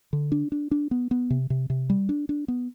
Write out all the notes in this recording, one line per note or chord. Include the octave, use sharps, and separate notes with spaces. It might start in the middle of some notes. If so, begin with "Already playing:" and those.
D3
D4
D4
D4
B3
B3
C3
C3
C3
G3
D4
D4
B3